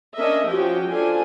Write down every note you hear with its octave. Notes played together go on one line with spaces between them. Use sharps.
C#4 D4 A#4 D#5 E5
F3 C#4 F#4 G4 G5
D4 F4 A4 C5 G#5